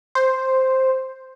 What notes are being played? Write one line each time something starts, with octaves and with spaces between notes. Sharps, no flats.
C5